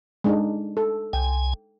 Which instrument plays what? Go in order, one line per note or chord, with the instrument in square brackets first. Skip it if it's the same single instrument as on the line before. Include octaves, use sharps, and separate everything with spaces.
[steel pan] G#3 D4 D#4
A4
[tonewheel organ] C2 G#5 [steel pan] G5